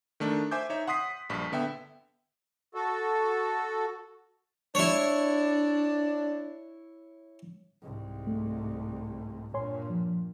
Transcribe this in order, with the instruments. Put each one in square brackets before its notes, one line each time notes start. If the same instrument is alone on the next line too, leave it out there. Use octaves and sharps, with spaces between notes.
[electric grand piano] D#3 A3 D4
C5 E5 G#5 D6 G6
D#4 C#5 E5
F#5 C6 D#6 B6 C7
A#1 G2 B6
D3 B3 E5 G5
[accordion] F#4 A4
[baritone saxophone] D4 [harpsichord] E4 C#5
[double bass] C2 G#2
[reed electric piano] A3
[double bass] G2 A#2 [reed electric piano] C#5 G#5 C6
[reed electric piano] F3